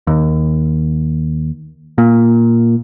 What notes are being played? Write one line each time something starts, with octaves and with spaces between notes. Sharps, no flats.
D#2
A#2